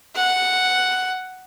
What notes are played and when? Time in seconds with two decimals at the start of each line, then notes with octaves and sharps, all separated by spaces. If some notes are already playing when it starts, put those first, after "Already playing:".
0.16 F#5